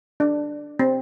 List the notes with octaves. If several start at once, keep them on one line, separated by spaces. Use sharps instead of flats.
D4
C4